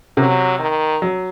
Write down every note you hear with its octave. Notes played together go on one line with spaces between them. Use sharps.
C3 F#3
D#3
F#3